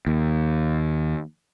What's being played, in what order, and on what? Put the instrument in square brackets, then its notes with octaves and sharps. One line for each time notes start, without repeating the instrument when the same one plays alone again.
[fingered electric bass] D#2